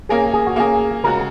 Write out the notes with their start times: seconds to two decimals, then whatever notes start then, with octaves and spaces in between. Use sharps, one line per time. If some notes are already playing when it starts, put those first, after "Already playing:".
0.09 A#3 C#4 G#4 A#4
0.33 G#4
0.47 F#4
0.56 A#3 C#4 G#4 A#4
1.04 C#3 G#3 F#4 A#4